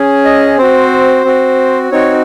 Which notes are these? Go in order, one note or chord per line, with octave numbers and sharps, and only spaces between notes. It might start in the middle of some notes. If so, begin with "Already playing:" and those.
Already playing: C#4 G#4
D#5
C4 F#4 C5
C4 F#4
C4 D#4 F#4 C#5